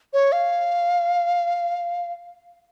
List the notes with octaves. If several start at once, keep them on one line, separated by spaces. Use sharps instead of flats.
C#5
F5